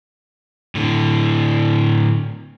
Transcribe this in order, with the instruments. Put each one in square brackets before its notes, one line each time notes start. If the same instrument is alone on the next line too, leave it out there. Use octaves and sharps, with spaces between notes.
[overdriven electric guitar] A2 D3